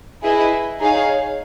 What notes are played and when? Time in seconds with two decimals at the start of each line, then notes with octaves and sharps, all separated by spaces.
0.23 E4 G#4 B4 D#5
0.79 D#4 G#4 C#5 F5